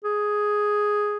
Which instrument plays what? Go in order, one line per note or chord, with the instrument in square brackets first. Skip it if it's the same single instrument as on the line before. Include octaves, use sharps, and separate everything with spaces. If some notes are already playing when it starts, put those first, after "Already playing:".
[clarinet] G#4